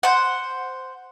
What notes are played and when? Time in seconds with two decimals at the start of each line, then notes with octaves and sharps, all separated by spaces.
0.03 C5 F#5